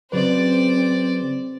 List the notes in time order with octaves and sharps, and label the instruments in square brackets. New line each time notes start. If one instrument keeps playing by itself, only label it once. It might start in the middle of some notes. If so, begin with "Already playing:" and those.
[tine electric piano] C#3 F#3 B4 [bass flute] C4 [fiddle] C5 D5